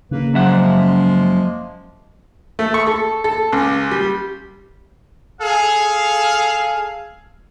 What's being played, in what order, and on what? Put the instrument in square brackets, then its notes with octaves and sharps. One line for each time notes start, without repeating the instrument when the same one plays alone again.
[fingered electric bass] C#3 [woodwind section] A#3 B4
[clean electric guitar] F#2 E5 F#5 [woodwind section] F3 G#3 A#3
[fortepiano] A3
C#6
A4
A4
C#2
G3
[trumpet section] G#4 A4 F5